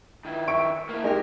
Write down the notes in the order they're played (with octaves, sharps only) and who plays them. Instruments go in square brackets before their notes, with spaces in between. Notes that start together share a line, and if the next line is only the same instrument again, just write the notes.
[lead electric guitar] D#3 E4
[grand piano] E5 C#6 D7
[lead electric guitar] A#3 E4
[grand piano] G#3 D#4 G4 [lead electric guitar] A#4